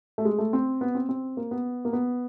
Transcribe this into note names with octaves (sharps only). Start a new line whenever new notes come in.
A3
G#3
A3
C4
B3
C4
C4
A#3
B3
A#3
B3